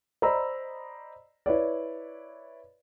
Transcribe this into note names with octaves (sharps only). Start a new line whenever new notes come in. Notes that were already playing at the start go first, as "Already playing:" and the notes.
C5 D5 D#5 A#5 B5 E6
E4 B4 C#5 D5